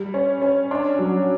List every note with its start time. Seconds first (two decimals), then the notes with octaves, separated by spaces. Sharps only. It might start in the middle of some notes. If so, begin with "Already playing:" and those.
Already playing: G3
0.14 C#4
0.42 C#4
0.71 D4
0.99 F#3